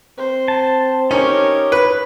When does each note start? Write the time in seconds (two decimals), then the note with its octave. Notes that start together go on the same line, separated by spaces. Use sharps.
0.18 C4 C5
0.48 A5
1.11 C#4 D#4 G4 A#4 C#5
1.72 B4